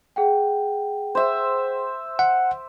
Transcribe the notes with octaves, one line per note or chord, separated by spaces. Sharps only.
G#4 F#5 G5
C5 E5
F#5